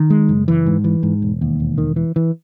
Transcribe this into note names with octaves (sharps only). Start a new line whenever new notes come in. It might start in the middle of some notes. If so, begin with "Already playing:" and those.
Already playing: D#3
G#3
F#1
E3
G#2
E3
G#2
E1
D#2
E1
D#3
E3
E3